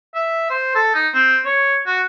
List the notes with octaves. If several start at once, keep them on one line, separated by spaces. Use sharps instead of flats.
E5
C5
A4
D#4
C4
C#5
F#4